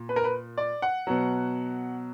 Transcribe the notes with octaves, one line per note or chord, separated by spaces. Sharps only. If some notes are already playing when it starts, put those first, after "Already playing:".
Already playing: A#2
B4
A#4
B4
D5
F#5
B2 F#3